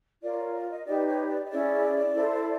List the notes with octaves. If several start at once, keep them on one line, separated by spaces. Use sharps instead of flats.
F4 A#4 C#5 D5
C#5
D5
D#5
D#4 G4 B4 D5
C#5
D5
D#5
C#4 E4 G#4 C#5 D5
E4 A4 C5